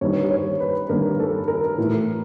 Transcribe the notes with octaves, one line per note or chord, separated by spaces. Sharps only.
G2 D#3 G3 A#3 C#5
C#5
B4
G2 D#3 G3 A#3 A#4
A4
A#4
A2 E3 A3